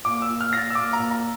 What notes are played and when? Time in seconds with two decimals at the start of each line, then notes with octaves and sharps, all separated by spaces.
0.05 A#2 D6
0.22 E6
0.29 A#2
0.41 F6
0.53 A#2 A6 A#6
0.70 E6
0.75 A#2 D6
0.93 A#5
0.99 A#2
1.11 A#5